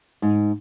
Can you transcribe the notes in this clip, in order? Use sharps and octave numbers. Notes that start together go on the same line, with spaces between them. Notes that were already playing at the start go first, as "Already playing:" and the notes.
G#2